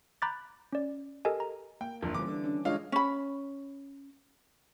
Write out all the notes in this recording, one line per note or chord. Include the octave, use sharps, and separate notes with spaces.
A#5 B5 D6 F#6 G6 A6
C#4 D5
G4 A4 A#4 D#5 G#5
A#5
A#3 G5
F#1 D3 F3
C#3 E3 F3 G3 D6
D3
C#4 D4
D3 G#3 F4 C#5 D#5 F5
C#4 B5